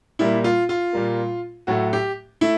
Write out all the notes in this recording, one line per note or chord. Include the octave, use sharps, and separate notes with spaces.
A#2 G3 A#3 E4
F4
F4
A#2 G3 A#3
A2 F#3 A3 F#4
G4
A3 E4